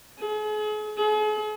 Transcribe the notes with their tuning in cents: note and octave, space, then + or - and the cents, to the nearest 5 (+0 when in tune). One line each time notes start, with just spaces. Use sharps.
G#4 +40
G#4 +45